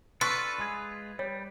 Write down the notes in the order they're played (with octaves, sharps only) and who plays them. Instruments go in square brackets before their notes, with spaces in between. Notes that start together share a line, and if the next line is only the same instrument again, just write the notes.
[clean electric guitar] D4 F4 A4 [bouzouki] B4 [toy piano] C6 C#6
[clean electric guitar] G#3 F4 G#4
[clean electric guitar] G3 [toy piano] C#5